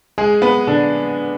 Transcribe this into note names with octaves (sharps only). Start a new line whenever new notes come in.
G#3 G#4
B3 B4
D3 D4